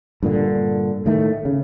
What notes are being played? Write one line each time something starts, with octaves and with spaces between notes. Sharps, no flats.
G2 A#2 D3
A2 D#3 A3
C#3